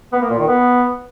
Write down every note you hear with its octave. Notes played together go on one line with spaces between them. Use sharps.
B3
A#3
A#2
D#3
B3